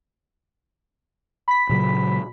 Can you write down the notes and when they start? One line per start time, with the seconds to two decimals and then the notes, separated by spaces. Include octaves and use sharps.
1.48 B5 B6
1.69 A#2 C#3 F#3